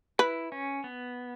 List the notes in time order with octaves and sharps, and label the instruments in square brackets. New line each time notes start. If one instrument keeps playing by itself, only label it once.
[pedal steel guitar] E4 [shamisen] B4
[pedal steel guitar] C#4
B3